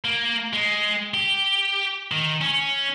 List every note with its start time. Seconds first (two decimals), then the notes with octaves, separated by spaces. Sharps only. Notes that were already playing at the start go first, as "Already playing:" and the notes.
0.05 A#3
0.53 G#3
1.14 G4
2.12 D#3
2.41 C#4